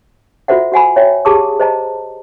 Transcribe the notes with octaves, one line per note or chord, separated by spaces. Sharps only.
F4 F#4 A4 C5 E5 F#5
F#4 F#5 G#5 B5
C#5 E5 G5
G4 G#4 A5 D6 D#6
C5 D#5 A5 A#5